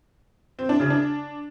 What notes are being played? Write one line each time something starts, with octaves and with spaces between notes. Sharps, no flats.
C4
D4
C#3
D4